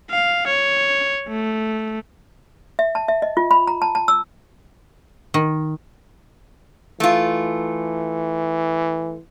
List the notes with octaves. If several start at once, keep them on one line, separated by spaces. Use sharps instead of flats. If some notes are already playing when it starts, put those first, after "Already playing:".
F5
C#5
A3
E5
A5
E5
D#5
F4
B5
A#5
A5
A5
E6
D#3
E3 A3 F4